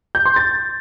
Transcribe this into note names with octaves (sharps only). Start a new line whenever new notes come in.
G6
C6
A6